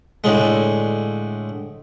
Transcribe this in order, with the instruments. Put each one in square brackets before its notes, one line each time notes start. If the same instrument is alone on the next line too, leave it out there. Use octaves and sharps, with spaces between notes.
[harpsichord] A2 D3 G#3